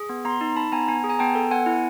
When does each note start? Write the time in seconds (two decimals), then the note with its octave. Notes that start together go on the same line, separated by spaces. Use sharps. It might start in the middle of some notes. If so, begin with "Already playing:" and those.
Already playing: G#4
0.09 B3
0.25 B3 A#5 C6
0.41 D#4
0.56 D#4 A5 B5
0.72 B3 G#5 A#5
0.88 B3 G#5 A#5
1.04 G#4
1.09 G#5 A#5
1.19 B3 G5 A5
1.35 A4
1.51 B3 F#5 G#5
1.66 E4